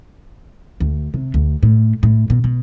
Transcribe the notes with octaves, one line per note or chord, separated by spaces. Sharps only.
D2
C3
D2
A2
A2
B2
B2